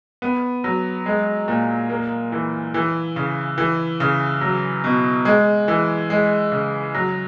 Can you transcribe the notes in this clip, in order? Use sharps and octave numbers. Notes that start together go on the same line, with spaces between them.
B3
F#3
G#3
A#2
A#3
E3
E3
C#3
E3
C#3
F#3
B2
G#3
E3
G#3
C#3
F#3